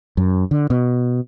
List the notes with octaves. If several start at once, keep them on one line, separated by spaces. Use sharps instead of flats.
F#2
D3
B2